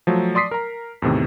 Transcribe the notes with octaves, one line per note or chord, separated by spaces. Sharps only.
F3 F#3 A3
D5 C6 D#6 B6 C7
A#4 A#5
E2 A2 C3 D#3